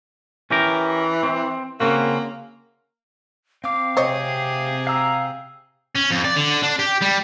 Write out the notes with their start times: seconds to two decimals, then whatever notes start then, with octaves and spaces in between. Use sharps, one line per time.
0.51 E3 C#4 G4 A#4
1.23 C4
1.80 C#3 A#3 C4 F#4
3.64 C4 F5 D6
3.97 C3 G4 G#4 C5 C#5 D#5
4.87 F5 A#5 E6
5.96 C#4
6.11 F2
6.25 D5
6.37 D3
6.63 D4
6.79 G4
7.01 G3